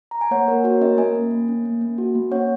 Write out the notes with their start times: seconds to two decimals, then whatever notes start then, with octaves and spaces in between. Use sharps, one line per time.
0.11 A#5
0.21 G#5
0.31 A#3 C#5 F#5
0.48 A#3 A#4
0.64 F#4 C#5
0.81 C#4 A#4 D#5
0.98 A#3 D#5 G#5
1.15 A#3
1.31 A#3
1.48 C#4
1.65 A#3
1.81 A#3
1.98 F#4
2.15 A#3
2.32 C#4 C#5 F#5